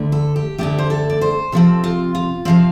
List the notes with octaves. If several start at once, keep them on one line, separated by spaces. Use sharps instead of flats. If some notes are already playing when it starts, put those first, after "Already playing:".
Already playing: D2 D3 A3
A4
G4
D2 D3 A3 G4
C5
A4
D5
C5
C3 F3 C4 A4
F4
F4
C3 F3 C4 F5